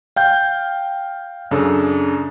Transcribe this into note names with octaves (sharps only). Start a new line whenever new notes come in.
F5 G5 G6
F#2 C#3 D4 A4